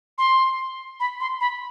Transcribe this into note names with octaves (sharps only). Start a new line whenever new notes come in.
C6
B5
C6
B5